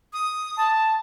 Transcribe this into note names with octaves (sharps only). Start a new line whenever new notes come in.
D#6
A5